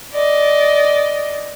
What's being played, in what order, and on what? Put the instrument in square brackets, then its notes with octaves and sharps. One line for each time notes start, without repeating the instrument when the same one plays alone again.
[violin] D5 D#5